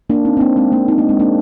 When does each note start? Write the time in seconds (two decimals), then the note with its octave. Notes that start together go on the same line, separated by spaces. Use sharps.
0.10 A#3 D4
0.25 C4 D#4
0.37 C4
0.41 A#3 D4
0.56 G#3 C4
0.72 A#3 D4
0.88 C4 D#4
0.98 A#3 D4
1.09 G#3 C4
1.19 A#3 D4